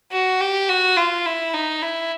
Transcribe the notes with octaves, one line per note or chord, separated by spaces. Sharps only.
F#4
G4
F#4
F4
E4
D#4
E4